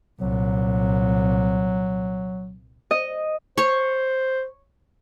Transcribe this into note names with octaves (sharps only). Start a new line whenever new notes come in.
C2 A#2 F#3
D#5
C5 C#5 C#6